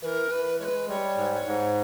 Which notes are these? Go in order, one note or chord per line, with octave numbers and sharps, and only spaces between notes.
E3 A#4 B4
E3 B4
G#3 B4 C#5
G3 C#5
G#2
C#5
G#2